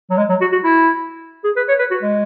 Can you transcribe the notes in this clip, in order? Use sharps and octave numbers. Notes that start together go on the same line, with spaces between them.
F#3
G#3
F#3
F#4
F#4
E4
G#4
B4
C#5
B4
F#4
G#3